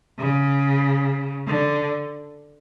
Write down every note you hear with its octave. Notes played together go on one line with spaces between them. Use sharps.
C#3
D3